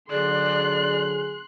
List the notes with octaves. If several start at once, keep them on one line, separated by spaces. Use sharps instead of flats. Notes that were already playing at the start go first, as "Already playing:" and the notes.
D3 F#3 G#4 D5 C6 F#6